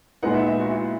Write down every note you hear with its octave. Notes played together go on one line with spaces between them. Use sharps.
A#2 G#3 B3 D#4 F#5
E5
E5
F#4
E4